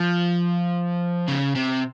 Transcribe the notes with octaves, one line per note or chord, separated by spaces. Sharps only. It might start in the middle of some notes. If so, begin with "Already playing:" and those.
Already playing: F3
C#3
C3